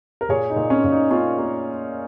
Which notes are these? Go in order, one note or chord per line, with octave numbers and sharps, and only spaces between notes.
A#4
A#2 G#4 C#5
D#4
A#2
C#4
A#2
D#4
A#3 C#4 F4
A#3